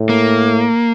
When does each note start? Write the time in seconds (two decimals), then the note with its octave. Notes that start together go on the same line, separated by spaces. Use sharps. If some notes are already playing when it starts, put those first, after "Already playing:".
Already playing: A2
0.09 A#3